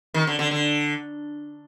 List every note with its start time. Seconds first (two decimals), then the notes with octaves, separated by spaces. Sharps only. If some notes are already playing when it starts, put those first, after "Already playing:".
0.14 D#3
0.27 D3
0.39 D3
0.51 D3